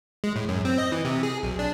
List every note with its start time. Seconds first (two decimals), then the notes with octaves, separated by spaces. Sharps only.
0.24 G#3
0.36 A2
0.49 F#2
0.65 C4
0.78 D#5
0.92 E3
1.05 C3
1.23 G#4
1.43 B1
1.59 D4